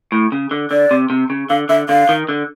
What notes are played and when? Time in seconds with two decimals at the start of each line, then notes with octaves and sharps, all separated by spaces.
0.12 A2
0.32 C#3
0.51 D3
0.71 D3 D5
0.91 C3
1.10 C3
1.30 C#3
1.50 D3 F5
1.69 D3 E5
1.89 D3 F5
2.09 D#3
2.29 D3